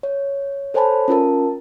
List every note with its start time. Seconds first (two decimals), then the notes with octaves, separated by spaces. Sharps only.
0.03 C#5
0.74 A4 C5 C#5 G#5 A5 B5
1.08 C#4 F4 A#4 A5